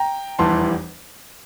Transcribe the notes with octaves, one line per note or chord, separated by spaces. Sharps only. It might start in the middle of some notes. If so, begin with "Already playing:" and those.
Already playing: G5 A#5
F1 E2 E3 G3 A5 C6